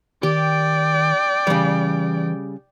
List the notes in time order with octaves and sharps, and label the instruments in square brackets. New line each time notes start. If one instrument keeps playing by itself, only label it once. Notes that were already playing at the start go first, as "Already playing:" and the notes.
[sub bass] D#3 [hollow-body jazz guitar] G4 [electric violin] D5 G5
[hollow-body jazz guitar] C#3 G3 [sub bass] E3